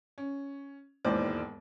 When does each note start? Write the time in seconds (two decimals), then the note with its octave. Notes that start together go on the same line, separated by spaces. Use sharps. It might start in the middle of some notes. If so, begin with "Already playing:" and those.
0.18 C#4
1.05 E1 D#2 G#2 E3 C5 D5